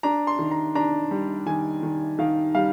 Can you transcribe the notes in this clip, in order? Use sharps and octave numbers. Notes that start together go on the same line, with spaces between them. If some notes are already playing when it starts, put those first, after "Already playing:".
D4 A#5
C6
D#3
A#5
D4 A#5
G3
D#3 G#5
D#3
D#3 F5
G3 F5